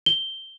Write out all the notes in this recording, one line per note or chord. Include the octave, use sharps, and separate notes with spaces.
G7